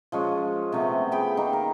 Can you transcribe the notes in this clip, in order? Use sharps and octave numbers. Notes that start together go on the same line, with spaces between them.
F3 G#3 C#4
C3 A3 B3
G#4 G5 B5
D#3 A#3
A#4